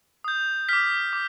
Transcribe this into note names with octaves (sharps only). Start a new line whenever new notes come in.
D#6 G6
D6 F6 B6
D6